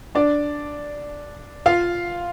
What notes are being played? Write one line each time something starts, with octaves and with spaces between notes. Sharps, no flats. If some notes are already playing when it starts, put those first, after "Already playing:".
D4 D5
F4 F5